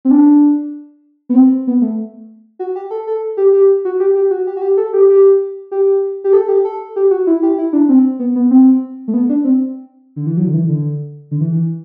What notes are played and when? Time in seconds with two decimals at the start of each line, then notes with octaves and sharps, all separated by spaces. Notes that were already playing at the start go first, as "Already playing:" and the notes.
0.05 C4
0.11 D4
1.29 B3
1.35 C4
1.67 B3
1.82 A3
2.59 F#4
2.76 G4
2.91 A4
3.07 A4
3.37 G4
3.53 G4
3.85 F#4
4.00 G4
4.15 G4
4.31 F#4
4.47 G4
4.57 F#4
4.62 G4
4.77 A4
4.93 G4
5.09 G4
5.71 G4
6.24 G4
6.33 A4
6.48 G4
6.65 A4
6.96 G4
7.11 F#4
7.27 E4
7.43 G4
7.58 E4
7.73 D4
7.89 C4
8.19 B3
8.36 B3
8.51 C4
9.08 A3
9.14 B3
9.29 D4
9.45 C4
10.16 D3
10.27 E3
10.37 F#3
10.47 D3
10.54 E3
10.69 D3
11.31 D3
11.41 E3
11.52 E3